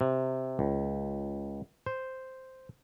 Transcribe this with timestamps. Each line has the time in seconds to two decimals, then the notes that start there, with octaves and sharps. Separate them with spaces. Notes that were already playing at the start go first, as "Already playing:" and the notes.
0.01 C3
0.59 C#2
1.86 C5